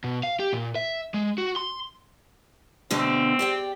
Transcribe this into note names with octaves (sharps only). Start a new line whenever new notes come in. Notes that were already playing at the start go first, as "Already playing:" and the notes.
B2
F5
G4
A#2
E5
G#3
F#4
C6
B2 D3 A3 C4
G4 D5 G5